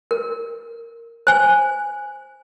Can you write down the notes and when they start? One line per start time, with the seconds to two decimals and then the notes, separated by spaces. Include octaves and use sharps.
0.11 A#4
1.27 C5 G#5